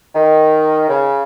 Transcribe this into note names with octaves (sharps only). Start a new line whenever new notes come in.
D#3
C#3